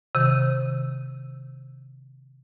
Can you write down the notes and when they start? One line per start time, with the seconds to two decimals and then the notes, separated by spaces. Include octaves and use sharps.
0.15 C3 D#3